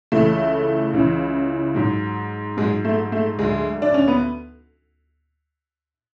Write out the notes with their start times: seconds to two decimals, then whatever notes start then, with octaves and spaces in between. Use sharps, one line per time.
0.12 C#2 C#3 E3 A3
0.93 C#2 C#3 E3
1.75 G#2 F#3
2.57 G#2 G#3
2.61 F#3
2.85 A3
3.12 A3
3.38 D2 D3 F#3 G#3
3.82 D4
3.94 C#4
4.08 B3